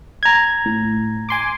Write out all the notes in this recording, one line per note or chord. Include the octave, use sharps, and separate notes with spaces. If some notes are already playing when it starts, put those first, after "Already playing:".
A#5 G#6
A2
G#5 C6 D6